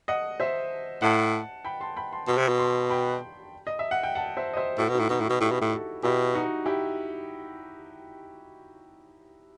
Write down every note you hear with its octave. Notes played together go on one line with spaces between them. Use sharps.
D#5 F#5
C5 E5
A2 F#5 A5
G5 B5
A5 C6
G5 B5
A5 C6
B2 A5 C6
C3
B2
A5 C6
G5 B5
D#5
E5
F#5
G5
F#5 A5
C5 E5
D#5
C5 E5
A2 F#4 A4
B2
D#4 F#4
A2
B2 D#4 F#4
A2 D#4 F#4
B2
A2 E4 G4
B2
A2
F#4 A4
B2 E4 G4
D#4 F#4
E4 G4